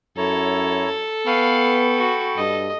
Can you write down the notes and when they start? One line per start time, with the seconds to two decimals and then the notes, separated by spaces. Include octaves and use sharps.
0.17 F#2 E4 A4 C#5 A#5
1.26 B3 B4 F5 G5 B5 C#6
1.97 F#4
2.37 G2 D#5